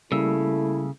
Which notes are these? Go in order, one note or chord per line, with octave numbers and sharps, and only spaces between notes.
C#3 G3 A3 A#3 E4 E6